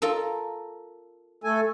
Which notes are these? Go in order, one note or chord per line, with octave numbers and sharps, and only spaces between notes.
F4 A4 A#4
A3 A4 G#5